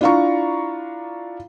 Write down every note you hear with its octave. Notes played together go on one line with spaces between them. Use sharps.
D4 E4 F4 F5 A#5 C#6